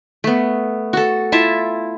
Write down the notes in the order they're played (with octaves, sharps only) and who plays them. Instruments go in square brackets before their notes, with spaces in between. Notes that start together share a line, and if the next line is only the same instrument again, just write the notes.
[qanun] A3 B3
F#4 A4
E4 F4 E5 A5